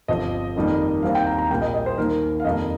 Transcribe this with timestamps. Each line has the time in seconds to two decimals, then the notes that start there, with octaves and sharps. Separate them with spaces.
0.08 G1 G2 F3 C4 D#5
0.56 F2 D#3 G3 A#3
1.03 D#2 D#3 G3 C4 F5
1.15 G5
1.27 A#5
1.38 A#5
1.51 A#1 A#2 G3 A#3 G5
1.62 D#5
1.74 D#5
1.86 C5
1.98 D#2 D#3 A#3 A#4
2.40 F5
2.45 F2 D#3 G3 A#3 D#5